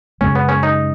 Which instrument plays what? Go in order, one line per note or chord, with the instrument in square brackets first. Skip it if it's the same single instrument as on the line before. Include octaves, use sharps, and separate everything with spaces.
[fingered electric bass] F#2 C#3 G#3 [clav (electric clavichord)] C#4
[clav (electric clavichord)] B3
C#4
D#4